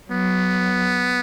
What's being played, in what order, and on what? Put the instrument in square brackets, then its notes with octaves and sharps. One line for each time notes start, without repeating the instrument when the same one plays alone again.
[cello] F#3 [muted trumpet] B3